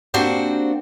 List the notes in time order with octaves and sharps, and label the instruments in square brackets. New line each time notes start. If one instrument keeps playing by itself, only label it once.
[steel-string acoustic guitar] A#3 C4 D4 F#4 G4 C5